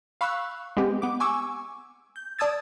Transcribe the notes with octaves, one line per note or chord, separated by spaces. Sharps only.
F5 B5 C#6 E6 F#6
G#3 B3 C4 G4
B3 D6
G#5 C#6 D6 E6
G6
D5 A5 D#6 E6 G#6 A6